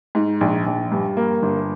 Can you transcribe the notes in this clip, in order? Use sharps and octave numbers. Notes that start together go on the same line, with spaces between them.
G#2
A#1
A#1
G2
A#3
G1